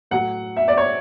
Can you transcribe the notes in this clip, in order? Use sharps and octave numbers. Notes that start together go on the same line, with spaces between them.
A2 F#3 F#5
E5
D5
C#5